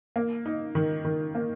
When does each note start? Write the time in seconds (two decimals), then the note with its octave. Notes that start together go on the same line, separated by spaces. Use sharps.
0.16 A#3
0.46 D#4
0.75 D#3
1.05 D#3
1.35 A#3